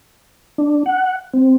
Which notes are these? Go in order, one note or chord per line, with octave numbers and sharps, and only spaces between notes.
D4
F#5
C4